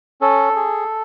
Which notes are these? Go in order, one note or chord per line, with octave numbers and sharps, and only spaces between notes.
C#4 A4
G#4